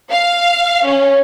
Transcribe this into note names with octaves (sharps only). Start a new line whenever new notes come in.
F5
C#4